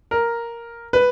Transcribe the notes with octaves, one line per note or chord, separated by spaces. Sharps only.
A#4
B4